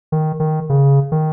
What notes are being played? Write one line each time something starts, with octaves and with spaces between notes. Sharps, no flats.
D#3
D#3
C#3
D#3